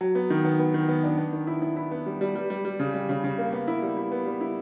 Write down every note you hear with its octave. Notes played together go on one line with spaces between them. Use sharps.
F#3
B3
D#3
B3
B3
D#3
B3
D4
B3
D#3
E4
E4
E4
B3
G3
G3
G3
G3
G3
C#3
G3
C#3
C#3
A#3
B3
E4
G3
E4
B3
G3
E4